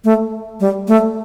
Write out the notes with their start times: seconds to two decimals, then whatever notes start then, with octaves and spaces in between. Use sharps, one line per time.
0.04 A3
0.60 G3
0.88 A3